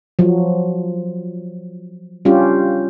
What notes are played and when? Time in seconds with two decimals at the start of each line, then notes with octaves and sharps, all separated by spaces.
0.19 F3 F#3
2.25 G3 C#4 D4 F4 G4